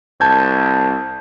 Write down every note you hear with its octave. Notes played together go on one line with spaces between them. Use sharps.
C2 A5 G6 G#6